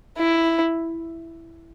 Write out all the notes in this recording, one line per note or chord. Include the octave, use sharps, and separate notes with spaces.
E4